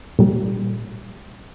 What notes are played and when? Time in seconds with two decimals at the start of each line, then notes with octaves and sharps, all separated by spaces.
0.19 A#2 G3